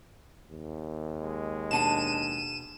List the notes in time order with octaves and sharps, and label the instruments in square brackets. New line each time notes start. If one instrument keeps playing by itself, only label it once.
[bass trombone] D#2
[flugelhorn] G#3
[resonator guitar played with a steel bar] B2 D4 F#5 [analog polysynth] D#7 E7